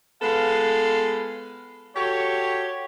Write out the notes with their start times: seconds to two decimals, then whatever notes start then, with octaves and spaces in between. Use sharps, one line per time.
0.22 G#3 B3 F4 A4 B4 F5
1.96 F#4 G4 A4 C#5